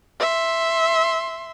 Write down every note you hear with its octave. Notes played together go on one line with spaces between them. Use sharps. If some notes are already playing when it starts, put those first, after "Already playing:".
E5 C6